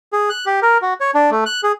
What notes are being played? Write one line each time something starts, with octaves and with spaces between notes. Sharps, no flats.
G#4
F#6
G4
A#4
F#4
C#5
D4
A3
F#6
G#4